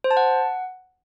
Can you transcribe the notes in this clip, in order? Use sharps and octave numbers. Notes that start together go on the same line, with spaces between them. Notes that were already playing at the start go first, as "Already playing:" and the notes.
C5
A5
F#5